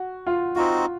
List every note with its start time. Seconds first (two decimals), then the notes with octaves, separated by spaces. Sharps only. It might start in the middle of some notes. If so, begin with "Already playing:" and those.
Already playing: F#4
0.27 F4
0.56 C4 D#4 F4 F#4